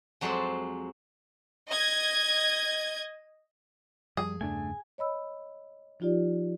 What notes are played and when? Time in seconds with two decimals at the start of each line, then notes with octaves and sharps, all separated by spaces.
0.21 F2 F#3 G#3 C5 D5 C6
1.68 D#5 G#6
4.17 F#2 F3 G3 G#4
4.41 E2 G2 C#3 A3 D4 G#5
4.98 C#5 D#5 B5 E6
6.00 F3 D#4 F4 G4 D5